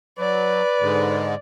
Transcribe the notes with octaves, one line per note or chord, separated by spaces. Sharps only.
F#3 B4 D5
G#2 D3 G#3